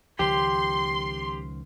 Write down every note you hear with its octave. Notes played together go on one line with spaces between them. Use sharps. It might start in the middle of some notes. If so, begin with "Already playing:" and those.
C#2 D#3 F3 G4 C6